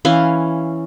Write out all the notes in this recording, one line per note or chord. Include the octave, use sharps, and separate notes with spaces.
E3 C#4 F5